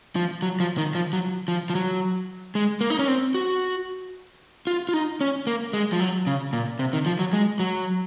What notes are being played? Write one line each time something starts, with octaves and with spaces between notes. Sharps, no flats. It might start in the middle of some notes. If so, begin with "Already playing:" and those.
F3
F#3
F3
D#3
F3
F#3
F3
F3
F#3
G#3
A#3
D#4
C#4
C4
F#4
F4
F4
D#4
C#4
A#3
G#3
F3
F#3
C#3
A#2
C3
D#3
F3
F#3
G#3
F#3